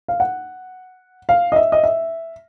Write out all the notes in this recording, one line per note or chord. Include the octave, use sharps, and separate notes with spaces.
F5
F#5
F5
D#5
E5
D#5
E5